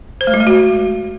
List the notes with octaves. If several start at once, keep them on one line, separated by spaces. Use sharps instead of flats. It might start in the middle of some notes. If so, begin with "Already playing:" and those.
C5
A3
G#3
A3
F#4